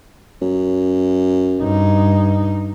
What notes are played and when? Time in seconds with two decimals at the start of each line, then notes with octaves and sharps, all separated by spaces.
0.42 F#2
1.60 G2 D#4